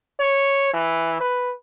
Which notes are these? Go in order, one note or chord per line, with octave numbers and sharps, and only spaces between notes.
C#5
E3
B4